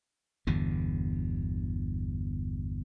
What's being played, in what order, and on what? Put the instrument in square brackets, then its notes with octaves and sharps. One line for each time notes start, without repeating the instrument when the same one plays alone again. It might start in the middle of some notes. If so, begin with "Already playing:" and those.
[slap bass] G1 E2 B2 D3